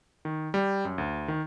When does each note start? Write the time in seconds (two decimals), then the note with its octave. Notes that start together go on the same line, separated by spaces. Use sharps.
0.25 D#3
0.54 G3
0.85 F#2
0.98 D2
1.28 D#3